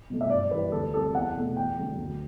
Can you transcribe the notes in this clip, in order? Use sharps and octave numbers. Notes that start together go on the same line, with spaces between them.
B2 F#3 A3
E5
G2 D5
E3 G3 B4
D2 A4
C3 G3 A4
E2 F#5
B2 A3
E2 G5
D3 F#3 A3
D2